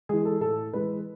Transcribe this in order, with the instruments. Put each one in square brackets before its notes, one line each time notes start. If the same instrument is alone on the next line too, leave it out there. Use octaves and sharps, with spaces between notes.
[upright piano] E3 G#3 G#4
A4
A2 A4
E3 G#3 B4